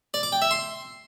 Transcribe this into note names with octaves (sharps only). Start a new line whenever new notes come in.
D5
D6
G5
E5
C6